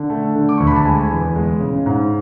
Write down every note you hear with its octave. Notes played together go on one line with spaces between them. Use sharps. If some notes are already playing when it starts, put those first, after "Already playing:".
Already playing: D3
A3
D3
D6
D2 C#6
B5
A5
G#3 G#5
E2
G#3
C#3
G#2